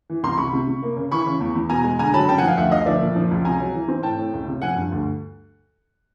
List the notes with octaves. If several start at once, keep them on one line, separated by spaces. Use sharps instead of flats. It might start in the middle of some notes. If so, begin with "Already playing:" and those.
E3
C2 A#5 C6
C3 B5 C#6
C3
C3
A#3
C#3
E3 B5 C#6
C#3
E2
E2
B2 G#5 A#5
G#3
D3 G#5 A#5
F#3 A5 B5
C#3 G5 A5
F#5 G#5
F3
F5 G5
D2 E5 F#5
D2 D#5 F5
F3 D5 E5
A#2
F3
C#2
C3 G#5 A#5
F#3
E3
C4
A2 G5 A5
A2
C#2
C3
F3 F#5 G#5
G2
D2